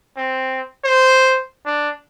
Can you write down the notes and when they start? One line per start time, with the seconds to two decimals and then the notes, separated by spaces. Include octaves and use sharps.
0.17 C4
0.84 C5
1.66 D4